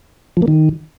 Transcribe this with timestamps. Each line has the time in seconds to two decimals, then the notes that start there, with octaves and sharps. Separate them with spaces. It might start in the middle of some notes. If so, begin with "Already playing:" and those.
0.37 F3
0.42 A#3
0.48 D#3